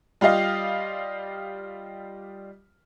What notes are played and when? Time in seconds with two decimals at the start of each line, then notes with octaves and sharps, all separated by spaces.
0.21 G3 F4 G4 D#5 F5